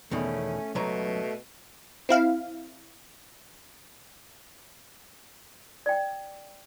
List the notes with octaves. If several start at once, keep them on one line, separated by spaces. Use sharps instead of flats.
E2 B2 D#3 A3 C#4
C#2 B2 F#3 A3 A#5
C4 E4 F5
D5 G5